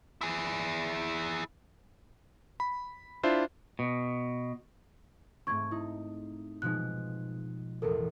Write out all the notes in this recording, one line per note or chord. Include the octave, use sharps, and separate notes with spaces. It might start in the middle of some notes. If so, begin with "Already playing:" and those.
E4 G#4
B5
D4 E4 F4 C5 E5
B2
G#2 A3 C4 C#6 G#6
D#4 E4
B2 F3 G#3 D#4 F#6
A1 E2 A4 A#4